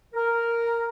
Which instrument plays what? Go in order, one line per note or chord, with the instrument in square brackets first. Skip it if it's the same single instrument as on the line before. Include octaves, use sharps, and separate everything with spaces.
[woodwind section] A#4